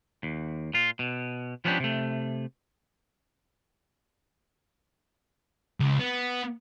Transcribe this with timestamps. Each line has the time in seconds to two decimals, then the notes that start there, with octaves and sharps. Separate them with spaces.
0.23 D#2
0.74 A#2 F4
0.99 B2
1.65 F3 G3 B3 C#4 D4 G4
1.80 C3 A3
5.80 C#2
5.99 B3